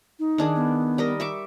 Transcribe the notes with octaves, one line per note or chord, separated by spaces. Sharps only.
D#4
D#3 D4 G#4
B3
G3 A#4 D#5
E5 C#6 D6